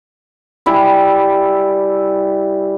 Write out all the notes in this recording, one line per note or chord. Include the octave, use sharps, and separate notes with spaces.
G3 E4 G#5